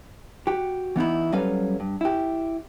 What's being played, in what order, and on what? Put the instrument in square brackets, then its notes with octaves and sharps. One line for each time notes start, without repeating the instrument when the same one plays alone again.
[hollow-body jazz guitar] F#4 G4
E3 B3 D#4 E4
F#3 G3 C#4 A4 B4 F5
G2
E4 G4